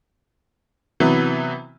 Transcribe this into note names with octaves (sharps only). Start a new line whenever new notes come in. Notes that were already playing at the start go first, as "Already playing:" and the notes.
C3 E3 F#3 B3